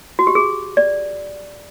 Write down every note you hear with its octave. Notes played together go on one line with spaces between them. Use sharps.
F#4
G4
G#4
D5